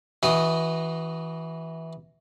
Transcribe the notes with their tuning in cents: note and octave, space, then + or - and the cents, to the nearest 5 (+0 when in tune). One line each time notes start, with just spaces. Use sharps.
E3 -15 F#4 +10 D#5 +0